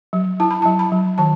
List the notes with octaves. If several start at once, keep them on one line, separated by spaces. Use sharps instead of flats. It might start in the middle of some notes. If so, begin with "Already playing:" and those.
F#3
E4 A5
B5
F#3 A5
B5
F#3
D#3 A5